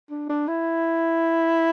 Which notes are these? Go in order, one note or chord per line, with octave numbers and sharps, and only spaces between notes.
D4
D4
E4